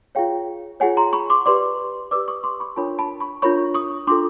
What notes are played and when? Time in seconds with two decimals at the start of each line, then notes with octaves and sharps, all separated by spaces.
0.15 F4 G#4 C#5 F5 G5
0.80 F4 G#4 C#5 F#5 G#5
0.97 A#5 C6
1.13 B5 C#6
1.30 C6 D6
1.46 G4 B4 D5 C6 D6
2.11 G4 B4 D5 D6 E6
2.28 C#6 D#6
2.44 C6 D6
2.60 B5 C#6
2.76 D4 F4 A#4 C#5 A5 B5
2.99 A5 B5
3.20 B5 C#6
3.42 D4 F4 A#4 C#5 B5 C#6
3.74 C#6 D#6
4.07 D4 F4 A4 C6 D6